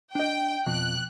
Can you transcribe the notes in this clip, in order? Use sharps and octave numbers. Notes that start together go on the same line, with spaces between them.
D4 D#5 G5
F2 B2 F#6